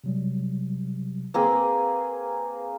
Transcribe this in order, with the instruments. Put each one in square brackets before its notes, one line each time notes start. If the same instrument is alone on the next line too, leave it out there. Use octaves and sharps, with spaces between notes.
[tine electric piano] C3 F#3 G3
[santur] A#3 C4 G#4 [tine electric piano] B4